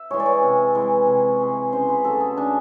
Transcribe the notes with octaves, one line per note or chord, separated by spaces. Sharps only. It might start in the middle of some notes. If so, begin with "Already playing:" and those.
Already playing: E5
E3 G#3 C#5
D5
C#5
C3
E3 G#3
C3
E3 G#3
C#3 C5
B4
F#3 A3 A4
G#4
C#3 D4